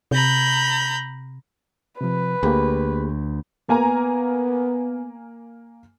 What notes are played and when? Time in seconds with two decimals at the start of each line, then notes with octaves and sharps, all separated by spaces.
0.11 C3 A#5 B5 G6
2.01 C3 F3 B4
2.43 D2 A#3 G4 G#4
3.69 A#3 B3 G#5 A#5